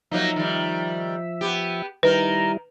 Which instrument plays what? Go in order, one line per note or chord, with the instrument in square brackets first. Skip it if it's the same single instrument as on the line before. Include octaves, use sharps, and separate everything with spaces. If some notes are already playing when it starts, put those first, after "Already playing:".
[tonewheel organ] F3 E5 [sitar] F#3 A#3 D#4
[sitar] D#3 G3
B3 G4
[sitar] D#3 A#4 [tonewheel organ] G3 E4 [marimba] B4